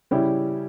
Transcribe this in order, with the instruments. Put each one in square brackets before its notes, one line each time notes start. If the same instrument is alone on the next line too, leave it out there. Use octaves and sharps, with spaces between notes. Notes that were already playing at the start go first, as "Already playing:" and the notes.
[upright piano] C#3 G3 C#4 E4 G4